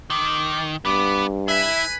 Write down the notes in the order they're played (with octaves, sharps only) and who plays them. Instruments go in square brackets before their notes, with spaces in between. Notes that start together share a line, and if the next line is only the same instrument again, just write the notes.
[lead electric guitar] D#3 [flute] D6
[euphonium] G2 [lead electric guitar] B3 [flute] D6
[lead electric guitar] E4 [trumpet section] B4 G#5 B5 [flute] E5